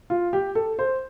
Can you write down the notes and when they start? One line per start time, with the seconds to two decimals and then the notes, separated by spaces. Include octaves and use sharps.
0.10 F4
0.33 G4
0.55 A4
0.79 C5